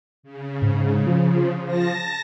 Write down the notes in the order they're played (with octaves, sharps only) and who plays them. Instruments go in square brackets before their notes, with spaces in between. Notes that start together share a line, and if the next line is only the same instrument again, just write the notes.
[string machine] C#3
[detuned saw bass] G#2
F3
[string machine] A5 A#6